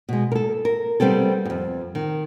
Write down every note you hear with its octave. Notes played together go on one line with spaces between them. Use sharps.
B2 G#3
A4 A#4
A#4
C3 G3 B3 C4 A4
F2 G#2
D#3